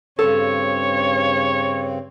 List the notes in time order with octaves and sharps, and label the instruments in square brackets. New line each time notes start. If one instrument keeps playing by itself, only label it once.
[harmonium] G2 C#3 C4 [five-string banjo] A4 [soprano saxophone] C#5